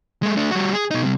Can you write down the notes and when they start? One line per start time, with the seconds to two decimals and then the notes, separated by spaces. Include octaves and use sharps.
0.23 G#3 A3
0.36 A3 D4
0.51 G3 F#4
0.73 G#4
0.91 B2 D#4
1.03 C3 G3